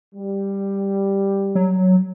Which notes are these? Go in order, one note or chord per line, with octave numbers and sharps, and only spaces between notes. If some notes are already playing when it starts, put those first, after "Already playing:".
G3
F#3